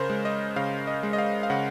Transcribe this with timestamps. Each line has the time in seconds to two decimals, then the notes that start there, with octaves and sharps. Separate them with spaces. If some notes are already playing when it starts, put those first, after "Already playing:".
Already playing: C#3 A#4 C5
0.10 G#3
0.25 D#5
0.56 C#3 F5
0.87 D#5
1.03 G#3
1.13 D#5
1.18 F5
1.43 F5
1.50 C#3 F#5